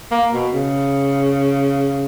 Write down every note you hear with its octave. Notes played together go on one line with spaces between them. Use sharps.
A#3
B2
C#3